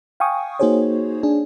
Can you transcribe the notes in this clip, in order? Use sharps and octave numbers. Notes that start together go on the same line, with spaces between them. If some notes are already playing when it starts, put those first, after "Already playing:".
F5 G5 G#5 C#6 D#6
A#3 D#4 F#4 G#4 C5 C#5
D4 G#4